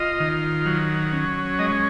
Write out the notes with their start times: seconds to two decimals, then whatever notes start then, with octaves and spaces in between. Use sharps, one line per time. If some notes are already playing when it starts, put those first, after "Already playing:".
Already playing: F4 D#5
0.20 D#3
0.66 F#3
1.12 C#4
1.59 G#3 D#5